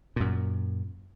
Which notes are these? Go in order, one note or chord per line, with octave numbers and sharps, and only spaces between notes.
F#2 A#2